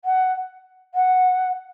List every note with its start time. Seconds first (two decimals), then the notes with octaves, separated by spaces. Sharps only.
0.05 F#5
0.95 F#5